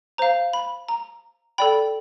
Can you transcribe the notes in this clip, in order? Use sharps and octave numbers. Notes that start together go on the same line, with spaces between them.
C5 F5 A#5
B5
A#5
A4 D5 G5 B5